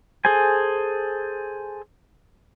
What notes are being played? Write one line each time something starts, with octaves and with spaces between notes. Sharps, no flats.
G#4 A4 C5 G#5